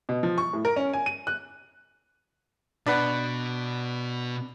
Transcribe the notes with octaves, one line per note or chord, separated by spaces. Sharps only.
B2
F3
C#6
A2
A#4
C#4
G#5
D#7
F#6
B2 D4 B4 F#5